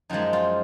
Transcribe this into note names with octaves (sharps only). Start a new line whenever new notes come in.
F#2 F3 G#3 D#4
F4